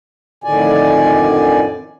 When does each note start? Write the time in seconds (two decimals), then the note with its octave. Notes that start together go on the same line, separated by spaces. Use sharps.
0.44 F2 A2 D3 D#3 D5 G#5